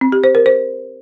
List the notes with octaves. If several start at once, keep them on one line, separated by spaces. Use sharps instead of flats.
C4
G4
C5
A#4
C5